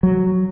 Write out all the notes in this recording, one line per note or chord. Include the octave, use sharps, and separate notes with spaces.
F#3